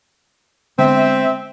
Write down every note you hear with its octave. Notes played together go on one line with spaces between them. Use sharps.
D3 G#3 B3 C4 E5